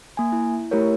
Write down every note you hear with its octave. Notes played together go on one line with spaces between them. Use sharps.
A#3 G#5
E4
A3 E4 G4 A#4 C#5